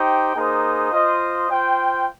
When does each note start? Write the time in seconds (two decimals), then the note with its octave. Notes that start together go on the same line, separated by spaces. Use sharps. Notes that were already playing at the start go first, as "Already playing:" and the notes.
Already playing: D#4 G4 C5 G5
0.34 A#3 D#4 G#4 C5
0.91 F4 C5 D#5
1.49 F4 C5 G5